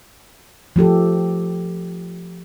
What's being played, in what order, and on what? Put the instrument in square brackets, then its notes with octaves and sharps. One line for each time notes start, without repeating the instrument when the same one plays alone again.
[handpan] F3 A3 G4 A4